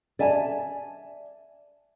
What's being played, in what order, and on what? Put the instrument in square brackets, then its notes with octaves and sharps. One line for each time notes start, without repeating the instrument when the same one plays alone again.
[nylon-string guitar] D5 E5 G#5 A5